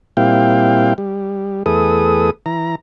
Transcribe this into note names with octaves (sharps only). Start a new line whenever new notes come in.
A#2 G3 C4 E4 F5 G5
G3
E2 A3 G#4 A4 B4 D#6
E3 A#5